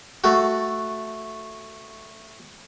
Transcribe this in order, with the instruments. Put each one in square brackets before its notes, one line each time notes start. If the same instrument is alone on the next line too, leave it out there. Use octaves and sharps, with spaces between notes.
[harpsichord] A3 F#4